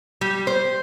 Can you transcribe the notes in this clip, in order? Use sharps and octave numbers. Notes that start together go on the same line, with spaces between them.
G3
C5